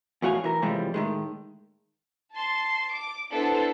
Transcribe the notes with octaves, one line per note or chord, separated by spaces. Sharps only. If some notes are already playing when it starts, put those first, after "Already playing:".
E2 A2 F#4 F5 G#5
E3 A#4
A2 C3 E3 F3 G3 G#3
A2 D#3 G#3
A5 C6
D6
B3 D4 E4 A4 C5 A5